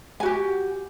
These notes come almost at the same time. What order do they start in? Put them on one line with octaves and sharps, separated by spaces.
G#5 F#4 G4